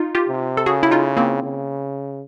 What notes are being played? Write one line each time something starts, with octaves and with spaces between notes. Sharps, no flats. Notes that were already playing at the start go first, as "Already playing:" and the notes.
Already playing: D#4 F4
F4 G4
C3
A4
C#3 F#4 G#4
E4
D#4 F4
A#3 C4
C#3